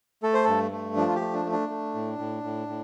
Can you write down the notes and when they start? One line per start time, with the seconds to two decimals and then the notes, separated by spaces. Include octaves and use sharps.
0.23 A3 A4
0.34 C5
0.44 G2 A4
0.71 A3
0.96 F3 D4
1.08 F4
1.15 G4
1.21 A3
1.34 D4
1.45 A3
1.52 D4
1.69 A3
1.94 A2
2.18 A2
2.43 A2
2.68 A2